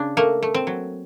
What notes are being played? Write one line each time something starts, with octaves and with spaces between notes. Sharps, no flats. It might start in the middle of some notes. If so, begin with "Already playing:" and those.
Already playing: C#3 D4
A3 A#3
A3
C4
F#3